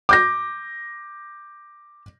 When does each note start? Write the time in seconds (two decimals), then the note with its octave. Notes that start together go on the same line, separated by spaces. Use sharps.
0.09 D6 G6 A#6